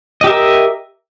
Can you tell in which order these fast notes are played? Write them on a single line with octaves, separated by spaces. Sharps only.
D#5 G4 E5 A#4